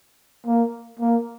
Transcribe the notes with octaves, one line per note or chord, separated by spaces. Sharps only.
A#3
A#3